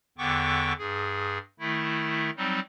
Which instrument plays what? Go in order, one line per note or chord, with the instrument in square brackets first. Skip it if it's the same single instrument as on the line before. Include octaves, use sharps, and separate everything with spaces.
[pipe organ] E2 D3 B3 G5 C#6 D6
G2 G#4
D#3 A3 E4
F#3 G3 C4 D#4